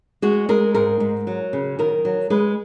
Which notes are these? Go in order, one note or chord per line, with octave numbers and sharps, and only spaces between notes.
G#3 F#4
G#3 A#4
G#2 A#4
G#2
F#3
C#3
D#3 A#4
F#3
G#3 B4